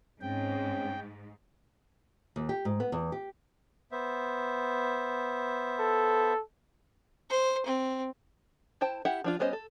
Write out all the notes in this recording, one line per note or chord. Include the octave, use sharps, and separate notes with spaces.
G#2 C4 C#4 G5
D#2
G4
G#2
B3
E2
G4
B3 C5 E5
A4
C5
C4
E4 C5 G5 A5
E4 G4 E5 F#5
F3 D4 F4
G3 B3 C#4 C5 D#5
A4